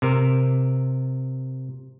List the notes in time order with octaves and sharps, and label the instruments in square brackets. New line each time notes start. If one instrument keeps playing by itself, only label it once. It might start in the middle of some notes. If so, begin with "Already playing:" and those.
[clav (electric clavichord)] C3 A#4